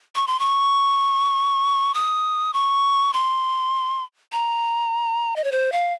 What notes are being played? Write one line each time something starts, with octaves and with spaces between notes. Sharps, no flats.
C#6
C6
C#6
D#6
C#6
C6
A#5
D#5
C#5
C5
F5